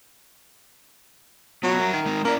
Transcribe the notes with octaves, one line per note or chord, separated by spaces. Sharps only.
F#3 B3 F4 F#4
A#4 E5 A#5
D#3
G#3 C4 D#4
A#3 C#4 E4 D5